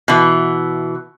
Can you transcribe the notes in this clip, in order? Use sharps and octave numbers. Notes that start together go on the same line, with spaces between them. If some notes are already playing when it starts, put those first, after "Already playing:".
B2 E3